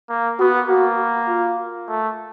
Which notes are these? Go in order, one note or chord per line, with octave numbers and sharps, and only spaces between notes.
A#3
B3 F#4
A#3 F#4
F4
A3